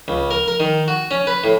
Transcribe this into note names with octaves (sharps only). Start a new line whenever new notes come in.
C#2
A#4
A#4
D#3
F#4
C#4
B4
A2